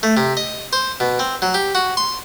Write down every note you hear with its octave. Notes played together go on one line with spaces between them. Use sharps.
A3
C3
D#5
C5
B2
C4
F#3
G4
F#4
C6